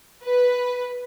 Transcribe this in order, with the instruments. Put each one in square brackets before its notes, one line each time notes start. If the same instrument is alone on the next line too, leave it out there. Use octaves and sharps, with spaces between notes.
[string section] B4